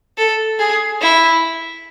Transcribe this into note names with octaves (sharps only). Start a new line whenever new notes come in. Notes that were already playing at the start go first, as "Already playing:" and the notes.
A4
G#4
E4